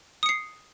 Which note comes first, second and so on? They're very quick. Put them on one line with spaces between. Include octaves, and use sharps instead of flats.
D#6 C#7 C7